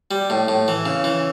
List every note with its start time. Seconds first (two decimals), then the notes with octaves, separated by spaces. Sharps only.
0.11 G3
0.30 A2
0.48 A2
0.68 E3
0.86 C#3
1.04 E3